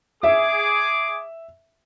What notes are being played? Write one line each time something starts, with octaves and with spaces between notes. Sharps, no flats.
G#4 E5 D6